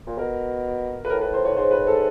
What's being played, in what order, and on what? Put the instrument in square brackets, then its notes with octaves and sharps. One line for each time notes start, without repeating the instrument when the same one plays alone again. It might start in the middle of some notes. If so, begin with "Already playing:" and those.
[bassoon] A#2
[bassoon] B2 [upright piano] A#4
[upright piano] B4
[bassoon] A2 [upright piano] A#4
[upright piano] B4
C5
C#5
[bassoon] G#2 [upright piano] C5
[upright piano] B4
A4